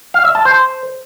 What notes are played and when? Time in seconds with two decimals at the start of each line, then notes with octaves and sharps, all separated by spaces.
0.14 F5
0.25 E5
0.35 A5
0.45 C5